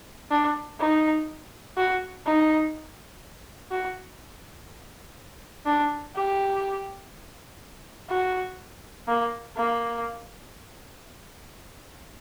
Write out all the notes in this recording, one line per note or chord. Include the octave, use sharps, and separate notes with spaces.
D4
D#4
F#4
D#4
F#4
D4
G4
F#4
A#3
A#3